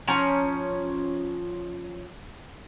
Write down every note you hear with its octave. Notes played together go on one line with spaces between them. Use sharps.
F3 C#4 A#5